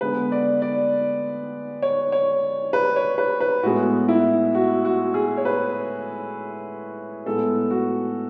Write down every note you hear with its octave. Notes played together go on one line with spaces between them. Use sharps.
D3 G#3 B3 B4
D5
D5
C#5
C#5
B4
C#5
B4
B4
A2 G#3 B3 F#4
E4
F#4
F#4
G#4
C#5
B4
A2 G#3 B3 A4
F#4